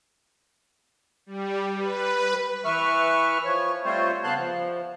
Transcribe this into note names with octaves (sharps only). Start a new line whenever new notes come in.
G3
B4
E3 B4 E5 C#6 F6
F3 C#5
G3 A3 C4 F4 C5 C#5
C#3 B3 F5 A5 C6 F#6
F3